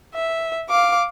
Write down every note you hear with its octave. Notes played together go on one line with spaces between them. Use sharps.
E5
F5 D6